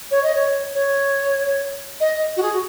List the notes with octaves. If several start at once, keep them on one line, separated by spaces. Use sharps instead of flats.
C#5
D#5
C#5
C#5
D#5
F#4
G#4
F#4